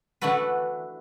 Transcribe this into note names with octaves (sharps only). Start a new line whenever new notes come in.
E3 A3 D4 F#4 A4 B4